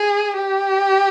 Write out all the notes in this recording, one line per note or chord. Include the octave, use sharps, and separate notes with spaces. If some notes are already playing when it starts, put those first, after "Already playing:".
Already playing: G#4
G4